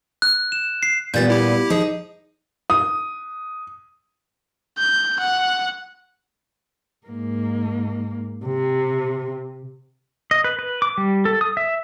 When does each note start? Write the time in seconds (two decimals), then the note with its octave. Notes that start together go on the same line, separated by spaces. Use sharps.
0.22 F#6
0.52 E7
0.83 C7
1.14 A#2 G3 B3 G6 A6
1.30 E4 G4
1.70 F3 D#4 G#4
2.70 D#6
4.78 G6
5.20 F#5
7.07 G#2 A#3
8.45 C3
10.31 D#5
10.44 B4
10.59 B4
10.82 D6
10.98 G3
11.25 A4
11.41 D#6
11.57 E5